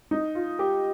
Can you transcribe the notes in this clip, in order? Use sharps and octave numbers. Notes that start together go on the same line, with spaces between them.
D#4
F4
G4